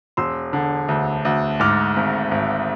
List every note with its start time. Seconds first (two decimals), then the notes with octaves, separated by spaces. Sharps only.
0.17 E1 C6 E6
0.53 D3
0.88 D2
1.25 D2
1.60 G#2 D6 F6
1.96 G#1
2.31 G#1